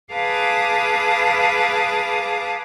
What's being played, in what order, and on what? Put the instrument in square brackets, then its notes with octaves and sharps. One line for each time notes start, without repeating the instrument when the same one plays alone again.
[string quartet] G#4 B4 F5 A5 D6 D#6